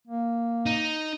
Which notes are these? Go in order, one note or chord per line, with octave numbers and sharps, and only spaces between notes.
A#3
D#4